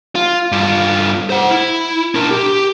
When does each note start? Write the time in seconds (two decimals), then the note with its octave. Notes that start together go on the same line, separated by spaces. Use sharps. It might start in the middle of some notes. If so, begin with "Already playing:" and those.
0.15 F4
0.52 G2 F4
1.30 C5 F#5
1.51 E4
2.15 D4 A#4
2.30 G4